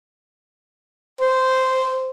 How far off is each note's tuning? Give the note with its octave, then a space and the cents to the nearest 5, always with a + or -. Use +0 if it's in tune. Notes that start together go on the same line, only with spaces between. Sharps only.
C5 -10